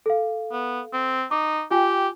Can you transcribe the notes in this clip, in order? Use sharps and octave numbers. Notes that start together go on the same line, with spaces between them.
A4 F5
B3
C4
D#4 D6
F4 G4 G5 G#5